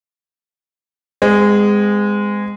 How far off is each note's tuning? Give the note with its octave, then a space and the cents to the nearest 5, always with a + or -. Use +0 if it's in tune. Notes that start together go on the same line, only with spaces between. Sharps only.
G#3 -15 C4 -45